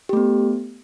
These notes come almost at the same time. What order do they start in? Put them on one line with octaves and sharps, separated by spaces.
G4 A3 B3